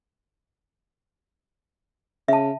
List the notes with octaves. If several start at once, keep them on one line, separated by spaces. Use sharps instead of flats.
C#3 E5 A5